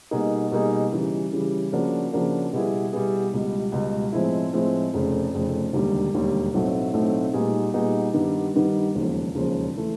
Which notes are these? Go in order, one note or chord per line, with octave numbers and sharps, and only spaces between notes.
B2 G3 A#3 D#4 G#4
B2 G3 A#3 D#4 G#4
C#3 E3 G3
C#3 E3 G3
C#3 F3 A#3 D4 F#4
C#3 F3 A#3 D4 F#4
B2 G3 B3 E4 G#4
B2 G3 B3 E4 G#4
C#2 B2 G3
C#2 B2 G3
A2 F3 G#3 C4 E4
A2 F3 G#3 C4 E4
F1 F2 C#3
F1 F2 C#3
E1 D#2 D3 G3
E1 D#2 D3 G3
B1 A2 F#3 A3 C4
B1 A2 F#3 A3 C4
A#2 G3 B3 D#4 G#4
A#2 G3 B3 D#4 G#4
G2 D#3 G3 B3
G2 D#3 G3 B3
E1 D#2 C#3 F3
E1 D#2 C#3 F3
E3 A3